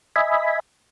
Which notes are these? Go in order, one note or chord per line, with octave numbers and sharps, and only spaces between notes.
D#5 E5 G#5 B5